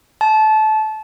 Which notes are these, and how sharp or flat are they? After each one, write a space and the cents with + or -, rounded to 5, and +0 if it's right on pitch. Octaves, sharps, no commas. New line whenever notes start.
A5 -25